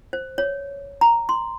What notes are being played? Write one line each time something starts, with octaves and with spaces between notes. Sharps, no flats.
C5
C#5
A#5
C6